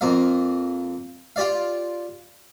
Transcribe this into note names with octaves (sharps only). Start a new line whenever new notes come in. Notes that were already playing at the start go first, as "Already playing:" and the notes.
F2 A#3 F5
F4 G4 D5 F5